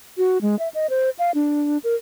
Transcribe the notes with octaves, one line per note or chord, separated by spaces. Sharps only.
F#4
G#3
E5
D#5
C5
F5
D4
A#4